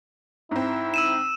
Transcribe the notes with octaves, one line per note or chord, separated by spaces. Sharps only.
G#2 C4 E4
E6 D#7 E7